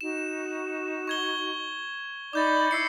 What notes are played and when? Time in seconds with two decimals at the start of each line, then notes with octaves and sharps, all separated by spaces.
0.01 D#4 F#4 E7
1.07 C#6 G#6 G7
2.33 D#4 D5 B5 D6 G6 A6
2.71 E4 D#5 E6 C7 C#7